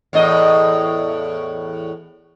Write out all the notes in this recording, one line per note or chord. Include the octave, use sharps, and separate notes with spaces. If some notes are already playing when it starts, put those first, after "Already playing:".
E2 A2 D#5